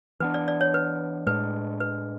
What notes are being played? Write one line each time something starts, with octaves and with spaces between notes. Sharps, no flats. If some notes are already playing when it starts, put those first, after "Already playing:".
E3 B3 D4 B4
D5
D5
C#5
B4
A2 G#3 D4 B4
B4